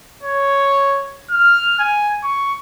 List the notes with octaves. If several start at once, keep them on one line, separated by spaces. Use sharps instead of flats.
C#5
F6
G#5
C#6